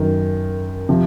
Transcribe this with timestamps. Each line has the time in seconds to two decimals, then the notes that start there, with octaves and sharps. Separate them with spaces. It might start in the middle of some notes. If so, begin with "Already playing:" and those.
Already playing: F#2 D#3
0.89 C3 F3